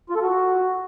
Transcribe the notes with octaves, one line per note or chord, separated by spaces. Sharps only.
F4
A4
F#4